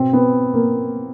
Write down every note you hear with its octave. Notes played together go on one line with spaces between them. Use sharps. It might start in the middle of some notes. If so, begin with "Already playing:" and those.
Already playing: B2 C4
B3
A#3